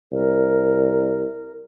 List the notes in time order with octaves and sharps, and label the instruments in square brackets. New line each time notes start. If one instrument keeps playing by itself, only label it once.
[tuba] C2 [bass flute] A#4